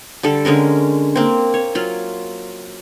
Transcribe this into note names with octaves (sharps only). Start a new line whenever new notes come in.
D3 G3 A4
D3 G#3 C#4 A#4
A#3 C4
C#5
F#3 F4